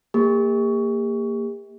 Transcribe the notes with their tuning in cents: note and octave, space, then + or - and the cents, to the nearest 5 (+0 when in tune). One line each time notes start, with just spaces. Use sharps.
A#3 -15 G4 +45